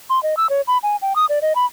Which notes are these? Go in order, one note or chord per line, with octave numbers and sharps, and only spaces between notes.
C6
D#5
E6
C#5
B5
G#5
G5
D#6
D5
D#5
B5